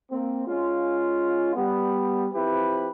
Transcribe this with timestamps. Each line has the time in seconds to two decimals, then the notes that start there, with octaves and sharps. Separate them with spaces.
0.11 A#3 C4
0.47 G#3 C#4 F4
1.55 G3 B3
2.34 F3 C4 E4 G4 B4